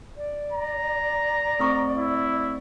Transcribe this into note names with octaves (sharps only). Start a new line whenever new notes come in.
D5
A#5
A3 C4 C#6
E4